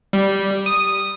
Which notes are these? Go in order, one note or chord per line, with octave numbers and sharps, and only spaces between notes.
G3
D#6